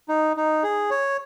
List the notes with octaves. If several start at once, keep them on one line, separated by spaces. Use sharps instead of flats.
D#4
D#4
G#4
C#5